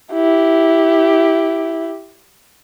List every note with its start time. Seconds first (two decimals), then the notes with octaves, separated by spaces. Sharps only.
0.13 E4 G4